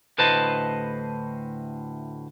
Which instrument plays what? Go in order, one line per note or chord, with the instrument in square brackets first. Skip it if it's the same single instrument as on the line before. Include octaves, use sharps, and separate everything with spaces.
[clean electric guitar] D2 A2 B4 C5 D#5 A5